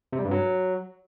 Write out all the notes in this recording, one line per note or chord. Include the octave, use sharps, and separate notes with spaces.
C3
G3
G2
F#3